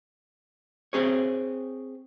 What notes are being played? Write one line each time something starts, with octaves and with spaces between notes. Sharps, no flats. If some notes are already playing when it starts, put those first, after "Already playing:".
C4 G#4 C#5